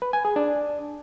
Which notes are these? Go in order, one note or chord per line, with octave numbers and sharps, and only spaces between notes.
B4
G#5
G#4
D4